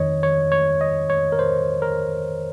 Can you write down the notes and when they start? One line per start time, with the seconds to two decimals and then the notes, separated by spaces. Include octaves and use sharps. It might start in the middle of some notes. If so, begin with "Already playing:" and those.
Already playing: F2 D#3 C#5 D#5
0.23 C#5
0.52 C#5
0.81 D#5
1.10 C#5
1.32 A#4
1.39 C5
1.82 A#4